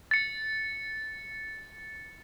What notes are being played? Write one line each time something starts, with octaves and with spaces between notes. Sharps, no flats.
A6 C#7